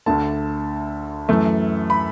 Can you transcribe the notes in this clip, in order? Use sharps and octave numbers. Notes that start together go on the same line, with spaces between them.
D2 D3 A3 A5
F#2 E3 A3
B5